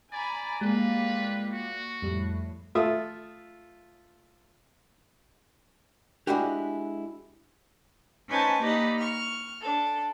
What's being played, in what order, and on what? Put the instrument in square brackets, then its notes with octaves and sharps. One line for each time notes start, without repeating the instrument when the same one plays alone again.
[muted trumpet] D5 [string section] G#5 A#5 B5
[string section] G3 A#3 F4 [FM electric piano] G#3 [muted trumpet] B4
[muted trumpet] F#4
[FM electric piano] F2 G3 [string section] A2
[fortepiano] A3 F4 E5 D#6
[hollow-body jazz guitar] G#3 D4 E4 F#4 G4
[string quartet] C#4 D#4 B4 C5 G#5 A5
A#3 D#4 G4 B4 D5 D#5
C#6 F6
D4 A4